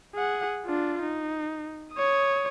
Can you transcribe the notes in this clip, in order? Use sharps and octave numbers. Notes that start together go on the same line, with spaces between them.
G#4 F#5
D4 F4
D#4
C#5 D#6